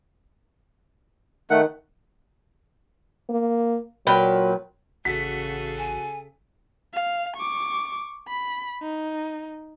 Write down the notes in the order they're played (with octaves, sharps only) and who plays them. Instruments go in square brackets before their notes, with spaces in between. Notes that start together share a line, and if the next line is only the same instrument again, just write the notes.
[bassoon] D#3 [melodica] A3 F#5
[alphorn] A#3
[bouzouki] A#2 B4 G5 [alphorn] F#3
[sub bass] A1 [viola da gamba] C#3 G#4 A4 [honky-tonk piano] F#4 B6
[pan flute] G#5
[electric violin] F5
C#6 D6
B5
D#4